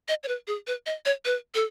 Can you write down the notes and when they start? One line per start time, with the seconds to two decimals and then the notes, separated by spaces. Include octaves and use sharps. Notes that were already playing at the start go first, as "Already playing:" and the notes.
0.08 D#5
0.23 C#5
0.28 B4
0.47 G#4
0.67 B4
0.86 D#5
1.05 C#5
1.25 B4
1.55 A4